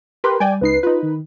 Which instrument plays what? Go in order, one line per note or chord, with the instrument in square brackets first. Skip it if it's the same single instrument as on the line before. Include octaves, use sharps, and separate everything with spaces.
[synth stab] G4 A#4 B4 [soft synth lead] C6
[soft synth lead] G3 [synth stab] D5 G5 G#5
[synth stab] C#2 D#4 C7 [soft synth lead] B4
[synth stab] D#4 B4 [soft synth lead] F4
[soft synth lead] D#3